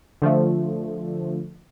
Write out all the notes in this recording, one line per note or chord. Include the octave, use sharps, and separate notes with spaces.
D3 F3 A3